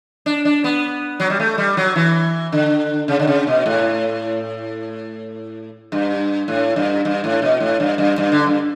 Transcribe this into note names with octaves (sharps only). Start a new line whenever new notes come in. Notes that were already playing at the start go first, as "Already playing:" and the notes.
D4
D4
B3
F#3
G3
A3
G3
F#3
E3
D3
C#3
D3
C#3
B2
A2
G2
A2
G2
G2
A2
B2
A2
G2
G2
G2
D3
G2